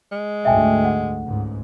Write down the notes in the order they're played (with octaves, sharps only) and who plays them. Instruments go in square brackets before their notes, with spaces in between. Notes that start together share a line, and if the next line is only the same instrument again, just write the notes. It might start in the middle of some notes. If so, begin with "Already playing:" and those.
[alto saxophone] G#3
[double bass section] D2 G#2 [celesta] E5 G5 G#5
[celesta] F#5
[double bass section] C#2 G#2